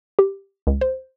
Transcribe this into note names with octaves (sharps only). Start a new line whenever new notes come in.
G4
C#2
C5